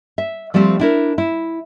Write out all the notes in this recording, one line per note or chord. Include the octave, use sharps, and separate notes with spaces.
E5
F3 G3 A3 C4 G4
D4 E4 A#4
E4